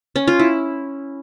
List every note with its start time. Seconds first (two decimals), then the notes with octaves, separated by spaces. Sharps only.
0.16 C#4
0.28 F4
0.39 E4